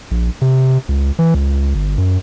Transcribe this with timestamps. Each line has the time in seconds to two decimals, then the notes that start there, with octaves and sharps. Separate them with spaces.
0.11 A#1
0.42 C3
0.89 C#2
1.19 E3
1.34 C#2
1.75 G1
1.98 F#2